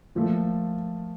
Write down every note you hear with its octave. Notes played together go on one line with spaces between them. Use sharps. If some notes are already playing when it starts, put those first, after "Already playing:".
A#2 F3 A3